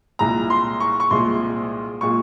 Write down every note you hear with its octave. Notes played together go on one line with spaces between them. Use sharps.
C2 A#2 G#3 A#5
C6
C#6
C#6
C2 A#2 G#3 C6
A#2 G#3 C#6